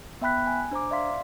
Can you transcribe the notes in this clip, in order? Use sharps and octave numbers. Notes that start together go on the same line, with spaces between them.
B3 E5 G5 B5 F#6 B6
G#5
D4 C5 A#5 D6
D5 E5 F5 C6 B6